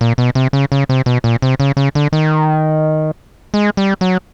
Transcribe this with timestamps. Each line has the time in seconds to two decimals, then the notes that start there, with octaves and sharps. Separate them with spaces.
0.01 A#2
0.18 B2
0.35 C3
0.53 C#3
0.72 C#3
0.89 C3
1.06 B2
1.24 A#2
1.42 C3
1.60 C#3
1.77 C#3
1.95 D3
2.12 D#3
3.54 G#3
3.77 G3
4.01 F#3